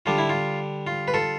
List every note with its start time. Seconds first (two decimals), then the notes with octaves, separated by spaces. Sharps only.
0.06 D3 G3 D4 F4
0.18 E4
0.29 F4
0.87 F4
1.08 B4
1.14 F4 A4